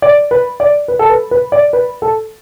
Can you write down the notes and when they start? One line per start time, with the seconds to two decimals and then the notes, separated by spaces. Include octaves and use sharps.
0.02 D5
0.31 B4
0.60 D5
0.88 B4
0.99 A4
1.10 B4
1.31 B4
1.52 D5
1.73 B4
2.02 A4